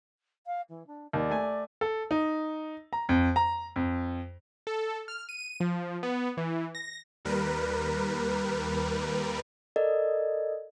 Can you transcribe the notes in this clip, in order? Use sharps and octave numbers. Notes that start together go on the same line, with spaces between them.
F5
E3
D4
D#2 D5
A3 G#5
A4
D#4
A#5
F2
A#5
F2
A4
F6
D#7
F3
B3
E3
A#6
D#2 G3 A#4 B4
A4 A#4 D5 D#5